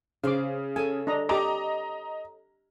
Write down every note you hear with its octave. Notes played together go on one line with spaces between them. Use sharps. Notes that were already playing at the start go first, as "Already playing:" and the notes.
C#3 C#4 G#4 C5 F5 D6
A4 C#5 G#5
D4 D#5 A#5
G4 D#5 A5 A#5 D6